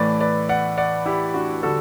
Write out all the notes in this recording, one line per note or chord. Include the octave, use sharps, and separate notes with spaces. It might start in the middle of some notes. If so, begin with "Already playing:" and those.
Already playing: A2 E3 A3 B4 D5
B4 D5
D5 F#5
D5 F#5
E4 G4
D4 F#4
D3 G3 F#4 A4